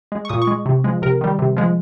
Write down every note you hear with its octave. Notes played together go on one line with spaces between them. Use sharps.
G#3
C#6
A#2 D#6
C#6
G#3
C3
F3 G#3
C3 A#4
D#3 G3
C3
F3 G#3